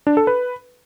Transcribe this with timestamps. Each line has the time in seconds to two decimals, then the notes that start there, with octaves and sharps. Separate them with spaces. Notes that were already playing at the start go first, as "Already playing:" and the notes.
0.07 D4
0.17 A4
0.27 B4